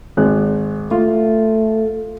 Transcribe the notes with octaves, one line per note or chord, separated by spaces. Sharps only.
G#1 G#3 F#6
A3 F4